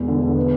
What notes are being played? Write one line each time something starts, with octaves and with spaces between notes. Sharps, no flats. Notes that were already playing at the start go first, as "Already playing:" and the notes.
Already playing: E1 E2
D3
D3
B3